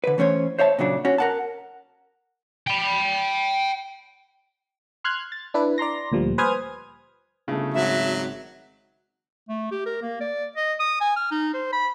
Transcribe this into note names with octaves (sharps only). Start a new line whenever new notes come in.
D3 B4
E3 A3 C#4 C5 C#5
C5 C#5 E5 A5
A#2 C#3 F#3 D4
C#4 F#4
A#4 F#5 A5
G5 B5
C6 F6 F#6 G#6
A6
D4 E4 B4
D5 A#5 C6 A#6
D2 A#2 F3 G3
B4 C5 G#5 D#6 F6 G#6
G1 C#3 A3
G#1 F#3 E5
A3
G4
A#4
A#3
D5
D#5
D#6
G#5
F6
D#4
C5
B5